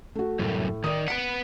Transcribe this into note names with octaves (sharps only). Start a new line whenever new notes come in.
A3 F#4
C2 F#2 A2
D#3 D5 D#6
B4 F#5 B6 D7